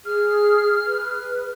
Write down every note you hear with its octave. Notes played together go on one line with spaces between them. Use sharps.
G#4 F6
B4